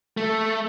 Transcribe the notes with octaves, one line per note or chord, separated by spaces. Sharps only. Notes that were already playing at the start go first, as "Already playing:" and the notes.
A3